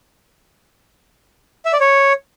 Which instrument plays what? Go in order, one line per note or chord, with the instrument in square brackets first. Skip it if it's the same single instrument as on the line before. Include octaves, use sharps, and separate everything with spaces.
[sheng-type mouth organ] E5
D5
C#5